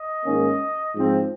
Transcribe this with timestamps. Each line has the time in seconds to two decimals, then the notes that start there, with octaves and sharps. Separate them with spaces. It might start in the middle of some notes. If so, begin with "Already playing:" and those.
Already playing: D#5
0.23 G#2 D#3 A#3 C#4
0.94 G#2 F3 C4